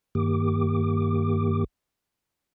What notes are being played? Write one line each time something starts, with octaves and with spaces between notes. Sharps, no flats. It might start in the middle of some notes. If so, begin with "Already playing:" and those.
G2 D#3 A#3 G4 D6